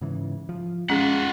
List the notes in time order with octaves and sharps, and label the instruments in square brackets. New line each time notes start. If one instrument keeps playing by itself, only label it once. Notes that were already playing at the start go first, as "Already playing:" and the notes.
[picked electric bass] G#2 C#3 E3
F3
[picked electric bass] G#3 [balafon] C#4 G#4 [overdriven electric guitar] F4 F#5